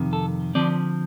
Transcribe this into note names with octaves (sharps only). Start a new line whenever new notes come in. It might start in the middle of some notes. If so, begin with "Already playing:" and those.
Already playing: F2 C3 D#3
A4
D3 F3 C4 D5